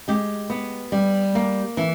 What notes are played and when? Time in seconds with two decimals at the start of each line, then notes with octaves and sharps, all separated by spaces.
0.08 G#3 G4
0.50 B3
0.92 G3
1.35 A#3
1.77 E3